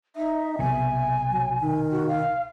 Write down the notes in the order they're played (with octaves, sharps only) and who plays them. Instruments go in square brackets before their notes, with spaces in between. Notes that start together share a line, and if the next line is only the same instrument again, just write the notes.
[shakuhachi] D#4 [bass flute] E5
[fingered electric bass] B1 C3 [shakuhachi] G#5
[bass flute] F#3
D#3
[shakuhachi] F#4
F5